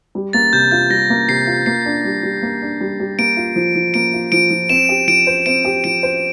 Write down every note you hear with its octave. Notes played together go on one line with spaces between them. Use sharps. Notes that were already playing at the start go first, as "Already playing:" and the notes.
G3
A#3 A6
C3 G6
F4 G6
G3 A#6
A#3
C3 C7
F4
A#3 C7
D4
G3
G3
A#3
D4
G3
G3
A#3 D7
F4
F3
F3
A#3 D7
F4
F3 D7
F3
C4 E7
G4
F3 D7
C5
C4 D7
G4
F3 D7
C5